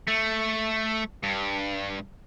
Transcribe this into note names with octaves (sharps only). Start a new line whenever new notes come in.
A3
G2